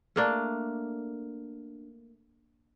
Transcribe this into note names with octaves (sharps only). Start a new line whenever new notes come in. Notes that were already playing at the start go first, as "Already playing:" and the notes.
A3 A#3 D4